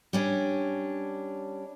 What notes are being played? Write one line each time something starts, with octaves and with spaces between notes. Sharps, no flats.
G3 C#4 D4